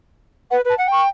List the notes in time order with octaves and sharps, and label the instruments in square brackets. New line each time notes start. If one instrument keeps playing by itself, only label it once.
[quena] B4 [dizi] F#5
[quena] B4
[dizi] A5
[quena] F#5
[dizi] G5 [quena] C#6